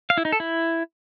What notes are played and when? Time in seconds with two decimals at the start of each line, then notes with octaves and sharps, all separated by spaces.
0.10 F5
0.17 E4
0.25 D#4
0.32 A4
0.40 E4